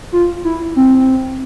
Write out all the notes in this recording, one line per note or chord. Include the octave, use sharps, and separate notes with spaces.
F4
E4
C4